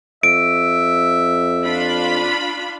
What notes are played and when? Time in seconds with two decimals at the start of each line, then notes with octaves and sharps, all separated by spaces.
0.23 F2 E5 D7
1.66 D4 F4 B5